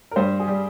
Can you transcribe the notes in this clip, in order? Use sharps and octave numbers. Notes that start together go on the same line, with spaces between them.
A#4
G2 C5
G#4
G3